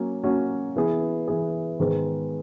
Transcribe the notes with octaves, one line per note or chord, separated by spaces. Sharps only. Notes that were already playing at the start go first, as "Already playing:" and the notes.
Already playing: F#3 A#3 C#4
F#3 A#3 C#4 F#4
E3 B3 E4 G#4 B4
E3 B3 E4 G#4 B4
G#2 D#3 G#3 B3